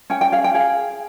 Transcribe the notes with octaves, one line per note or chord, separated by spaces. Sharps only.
C#4 G5
G5
G#4 F5
G5
G#4 F5